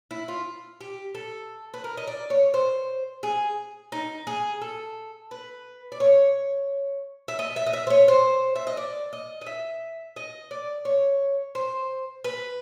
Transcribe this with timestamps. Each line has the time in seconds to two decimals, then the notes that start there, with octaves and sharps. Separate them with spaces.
0.11 E4
0.28 F4
0.81 G4
1.15 A4
1.74 B4
1.84 A#4
1.97 D#5
2.07 D5
2.30 C#5
2.54 C5
3.23 G#4
3.92 D#4
4.27 G#4
4.62 A4
5.31 B4
5.92 D5
6.00 C#5
7.28 E5
7.39 D#5
7.56 E5
7.66 D#5
7.73 E5
7.87 C5
7.90 C#5
8.08 C5
8.56 E5
8.67 D#5
8.77 D5
9.13 D#5
9.41 D#5
9.46 E5
10.16 D#5
10.51 D5
10.85 C#5
11.55 C5
12.24 B4